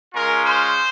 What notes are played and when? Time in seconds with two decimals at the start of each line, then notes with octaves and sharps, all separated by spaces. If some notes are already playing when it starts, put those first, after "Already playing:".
0.14 G#3 C#4 F4 A#4
0.46 C5